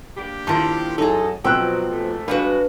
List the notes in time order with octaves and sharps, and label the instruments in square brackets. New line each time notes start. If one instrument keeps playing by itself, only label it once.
[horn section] A#3 D4 G4
[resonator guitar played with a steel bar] D#3 F3 A#4 [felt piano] E4 A5 C6
[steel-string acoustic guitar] F#2 [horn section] E3 F#3 A4 [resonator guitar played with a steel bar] D#4 G#4
[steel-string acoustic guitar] B2 F3 C4 [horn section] F#3 [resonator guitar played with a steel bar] G5 [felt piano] E6 F#6
[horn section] G#2 C3 A3
[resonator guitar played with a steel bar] G3 G#3 F#4 [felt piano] D4 F5 [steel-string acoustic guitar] B4